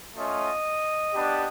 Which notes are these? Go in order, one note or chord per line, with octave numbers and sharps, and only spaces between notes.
A3 C#4 F4 D#5
B3 D4 G4